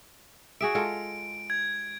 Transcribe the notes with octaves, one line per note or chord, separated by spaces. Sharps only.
F#4 G#4 E5 D7
G#3 F4 A4
G#6